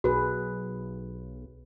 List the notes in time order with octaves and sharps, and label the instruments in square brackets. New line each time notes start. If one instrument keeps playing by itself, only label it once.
[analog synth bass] B1 [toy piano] F#4 [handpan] G#4 B4